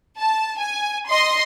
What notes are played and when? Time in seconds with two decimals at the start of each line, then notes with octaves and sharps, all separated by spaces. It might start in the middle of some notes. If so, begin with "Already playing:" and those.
0.19 A5
0.59 G#5
1.08 D#5 C6